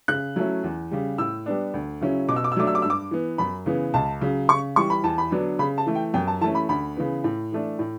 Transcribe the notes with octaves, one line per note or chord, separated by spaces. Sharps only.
C#3 F#6
F#3 A3 C#4 E4
E2
C#3 G3
A2 E6
G3 B3 D4
D2
C#3 F#3 C#4 E4
B2 D6
E6
D6
E6
F#3 A3 D4 D6
E6
D6
G2 E6
D6
E3 B3
F#2 B5
C#3 E3 B3
C#2 A5
C#3 F#3
C#3 C#6
E3 G3 C#6
B5
E2 A5
B5
D3 F#3 B3 D4
C#3 B5
A5
E3 A3
G5
F#2 G5
A5
E3 A3 C#4 A5
B5
D2 B5
C#3 E3 B3
A2
E3 A3 D4
A2